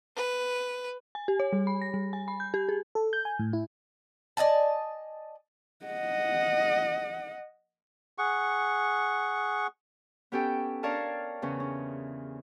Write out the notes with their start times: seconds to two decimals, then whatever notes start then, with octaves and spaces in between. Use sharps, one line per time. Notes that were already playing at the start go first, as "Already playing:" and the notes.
0.16 B4
1.15 G#5
1.28 G4
1.40 C#5
1.53 G3
1.67 B5
1.82 A#6
1.94 G3
2.13 G#5
2.28 B5
2.40 G6
2.54 G4
2.69 G#4
2.95 A4
3.13 G6
3.25 G#5
3.39 A2
3.53 E4
4.37 D5 D#5 G#5 A5
5.85 D#5 F#5
8.18 G#4 F#5 C#6
10.32 B3 C#4 G4 A4 G5
10.83 D4 A#4 C#5 D5 F5 A5
11.42 E2 C#3 C#4
11.60 C#4